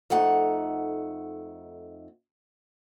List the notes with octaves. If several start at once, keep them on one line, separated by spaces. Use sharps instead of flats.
F2 A3 D#4 F#5 A#5